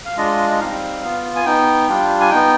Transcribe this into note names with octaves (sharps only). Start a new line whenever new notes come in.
F5
G#3 D4 F4 D#5
D#5
G3 C4 D#4 F5
B3 F4
G#5
B3 D#4 G5
G3 D4 F4
G#5
B3 D#4 G5